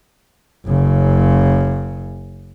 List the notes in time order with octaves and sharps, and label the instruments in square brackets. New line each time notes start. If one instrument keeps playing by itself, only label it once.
[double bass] F#1 C#3